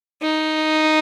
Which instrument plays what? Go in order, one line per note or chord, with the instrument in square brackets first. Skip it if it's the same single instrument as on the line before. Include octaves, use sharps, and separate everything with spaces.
[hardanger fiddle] D#4